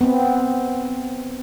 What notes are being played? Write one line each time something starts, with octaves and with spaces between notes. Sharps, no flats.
B3 C4